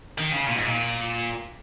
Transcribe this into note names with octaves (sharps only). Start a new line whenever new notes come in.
D#3
C#3
A#2
G#2
A#2